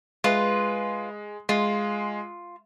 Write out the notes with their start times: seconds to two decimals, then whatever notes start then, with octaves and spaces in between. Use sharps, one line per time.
0.24 G#3 F4 B4
1.49 G#3 F4